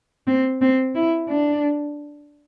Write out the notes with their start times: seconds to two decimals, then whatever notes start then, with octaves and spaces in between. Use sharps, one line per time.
0.27 C4
0.62 C4
0.95 E4
1.29 D4